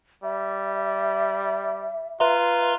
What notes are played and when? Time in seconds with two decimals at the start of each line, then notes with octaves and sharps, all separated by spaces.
0.23 G3 E5
2.20 F4 B4 E5 A#5 C6